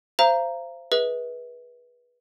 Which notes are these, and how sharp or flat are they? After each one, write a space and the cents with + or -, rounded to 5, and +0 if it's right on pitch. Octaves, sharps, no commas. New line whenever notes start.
C5 +0 F5 -35 A#5 +0
G#4 +0 B4 -20 E5 -45